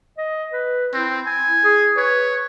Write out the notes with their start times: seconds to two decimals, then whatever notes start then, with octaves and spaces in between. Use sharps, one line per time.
0.18 D#5
0.53 B4
0.94 C4 E4
1.26 G#5
1.64 G#4
1.97 B4 C#5